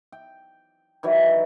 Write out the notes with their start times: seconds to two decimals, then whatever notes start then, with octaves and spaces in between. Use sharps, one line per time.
0.12 G5
1.03 D#3 E3 F#3